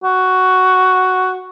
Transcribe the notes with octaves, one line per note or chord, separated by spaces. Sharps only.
F#4